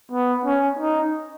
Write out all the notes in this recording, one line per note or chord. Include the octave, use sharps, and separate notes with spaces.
B3
C#4
D#4